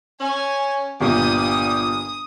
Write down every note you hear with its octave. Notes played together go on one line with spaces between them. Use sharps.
C#4 G#5
G1 A#2 G3 D#6